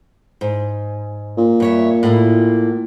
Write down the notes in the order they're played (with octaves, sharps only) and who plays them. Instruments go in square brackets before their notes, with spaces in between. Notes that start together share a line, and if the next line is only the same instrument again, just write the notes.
[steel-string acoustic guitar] G#2
[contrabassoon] A#2
[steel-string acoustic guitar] G2 C#5 E5
A2 A#3